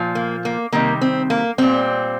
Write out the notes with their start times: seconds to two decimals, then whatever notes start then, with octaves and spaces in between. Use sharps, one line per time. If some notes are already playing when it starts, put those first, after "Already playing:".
Already playing: A#2 F3
0.15 A#3
0.45 A#3
0.72 C3 D#3 G3 A#3
1.01 C4
1.30 A#3
1.58 A#2 G3 C4